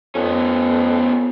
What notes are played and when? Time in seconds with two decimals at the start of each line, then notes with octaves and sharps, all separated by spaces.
0.15 F2 B3 C#4